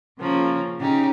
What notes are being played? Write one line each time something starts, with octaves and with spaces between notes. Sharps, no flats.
C#3 F3 A#3 C#4
C#3 C#4 D#4 G4